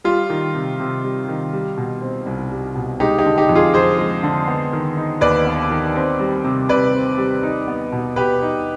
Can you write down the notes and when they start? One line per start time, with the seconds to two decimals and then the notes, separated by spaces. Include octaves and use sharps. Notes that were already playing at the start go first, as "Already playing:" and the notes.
0.04 G3 F4
0.30 D#3
0.55 C3
0.79 C3
1.04 G3
1.28 D#3
1.53 G3
1.77 B2
2.01 C4
2.26 C2
2.51 G3
2.75 B2
3.00 G#3 D#4 G4
3.18 D#4 G4
3.25 D3
3.38 D#4 G4
3.49 F2
3.55 F4 G#4
3.74 F2 G#4 C5
3.98 G#3
4.23 D3
4.48 B3
4.73 D#3
4.97 D#4
5.21 D#2 B4 D5
5.46 B3
5.71 D#3
5.95 C4
6.19 G3
6.44 C3
6.69 C3 B4 D5
6.94 C4
7.18 G3
7.43 D#4
7.68 B3
7.92 B2
8.16 B2 G4 B4
8.42 D#4